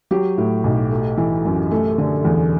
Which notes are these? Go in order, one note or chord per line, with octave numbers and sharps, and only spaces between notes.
F#3 G4
A2
B1
A3
E3
F#2
A3
D3
E2